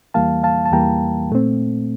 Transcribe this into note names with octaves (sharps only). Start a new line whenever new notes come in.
E2 E3 G3 A#3 F5 A5
F5 A5
A5
E2 E3 G3 A#3 G5 A#5
A#2 A3 C4